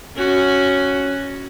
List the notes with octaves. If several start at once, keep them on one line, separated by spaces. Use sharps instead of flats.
C#4 F#4